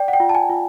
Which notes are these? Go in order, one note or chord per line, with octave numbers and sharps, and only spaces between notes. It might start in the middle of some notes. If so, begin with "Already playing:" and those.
Already playing: D5 G5
F#5
G5
F4
A5
G#5
F4